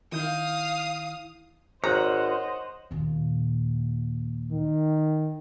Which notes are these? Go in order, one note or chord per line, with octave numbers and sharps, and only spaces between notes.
D#3 E4 F5 D#6 G6
G#1 C5 C#5 D#5 F#5 A#5
D#2 A#2
D#3